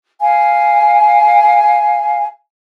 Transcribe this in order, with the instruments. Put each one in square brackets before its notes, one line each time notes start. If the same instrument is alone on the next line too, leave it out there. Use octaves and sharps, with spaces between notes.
[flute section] F5 G#5